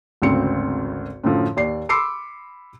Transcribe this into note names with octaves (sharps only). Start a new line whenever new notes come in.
G#1 D2 C#3 C4 C#7
F#2 A2 D3 F3
D#2 D5 C7
B5 C6 D6 E6 C7 C#7